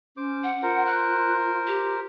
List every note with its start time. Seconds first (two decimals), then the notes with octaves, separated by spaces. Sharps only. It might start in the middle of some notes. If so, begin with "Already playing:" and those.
0.17 C#4 C5 D6
0.44 F#5
0.63 F4 A#4 C5
0.87 F#6
1.67 G4